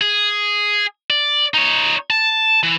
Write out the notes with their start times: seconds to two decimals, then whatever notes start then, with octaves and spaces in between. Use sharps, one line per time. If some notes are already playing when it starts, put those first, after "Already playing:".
0.01 G#4
1.10 D5
1.54 D#4 C#5
2.10 A5
2.63 E3